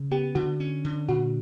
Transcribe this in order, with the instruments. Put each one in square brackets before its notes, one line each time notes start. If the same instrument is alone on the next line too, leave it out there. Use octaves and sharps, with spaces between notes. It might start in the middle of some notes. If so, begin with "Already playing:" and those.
Already playing: [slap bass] C#3
[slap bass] B3 [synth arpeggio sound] G4
[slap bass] D3 [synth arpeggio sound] F#4
[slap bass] C#4
D3
[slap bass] A#2 [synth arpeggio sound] F#4